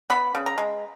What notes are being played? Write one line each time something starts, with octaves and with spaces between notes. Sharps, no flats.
B3 B5
C#3
A#5
G#3